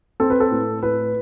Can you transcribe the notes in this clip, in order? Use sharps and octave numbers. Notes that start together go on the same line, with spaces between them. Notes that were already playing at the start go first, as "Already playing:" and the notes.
C4 A4
B4
A4
A2
A2 B4